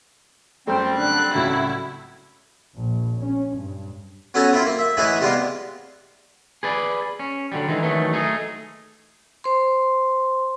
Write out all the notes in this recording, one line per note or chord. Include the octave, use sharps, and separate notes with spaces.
F#2 F#3 G3 A3 C4 C5 G5
D3 F#6
C#2 A2 F#3 A3 E4 F#4
A#1
C#4
G2
F#3 B3 C#4 A4 C#5
C4 E4 F4
A#3
E5
A2 E3 B3 D#4 E4 G#4
C3 G3 G#3 B3 F4
G#4 B4 D5
C#4
D3 F#3 G3
D#3 E3 G#3 D#4
D#3 E3 F#3 A3
A3 D#4 G#4
C5 C6